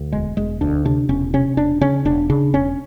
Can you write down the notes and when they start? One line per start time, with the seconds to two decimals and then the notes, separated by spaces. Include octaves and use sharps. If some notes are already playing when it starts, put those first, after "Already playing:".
Already playing: D2
0.12 E1 G#3
0.37 E1 G#3
0.61 D2 D4
0.85 C3 D4
1.09 E1 C#4
1.34 C3 C#4
1.57 E1 D4
1.81 C#3 C#4
2.05 E1 D4
2.30 C#3 D4
2.54 E1 C#4